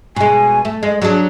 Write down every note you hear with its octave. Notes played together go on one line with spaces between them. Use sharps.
B2 G#3 G#5
A3
G#3 D#5
F#3 D4 G#4